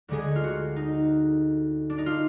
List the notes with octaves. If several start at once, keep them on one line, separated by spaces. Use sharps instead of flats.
D2 D3 G#3 G#4
F4
F#4
D#4
D4
D#4
F4